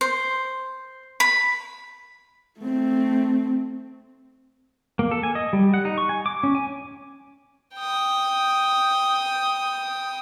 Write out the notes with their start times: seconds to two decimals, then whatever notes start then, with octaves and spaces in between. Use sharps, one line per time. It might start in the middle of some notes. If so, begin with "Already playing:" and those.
0.01 C5
1.20 B5
2.60 A3 C4
4.99 A#3
5.11 A4
5.23 G#5
5.35 D#5
5.53 G3
5.74 F#5
5.85 D#4
5.98 C#6
6.09 G#5
6.26 D6
6.43 C#4
6.55 G#5
7.76 G5 D#6